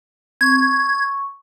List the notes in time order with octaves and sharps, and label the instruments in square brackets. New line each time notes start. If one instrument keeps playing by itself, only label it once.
[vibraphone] C4 C#6 [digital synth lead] G#6
[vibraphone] C#6